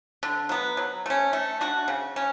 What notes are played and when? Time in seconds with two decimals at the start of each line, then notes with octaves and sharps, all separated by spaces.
0.23 D3
0.49 F#3 B3
0.77 F#3
1.06 A3 C#4
1.33 A3
1.61 D4 F#4
1.88 C#3
2.16 C#4